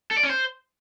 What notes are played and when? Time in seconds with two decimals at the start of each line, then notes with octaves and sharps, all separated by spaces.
0.11 A4
0.17 D5
0.23 C#4
0.30 C5